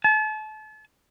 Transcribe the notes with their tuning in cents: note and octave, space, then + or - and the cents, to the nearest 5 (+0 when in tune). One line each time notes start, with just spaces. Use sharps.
A5 -35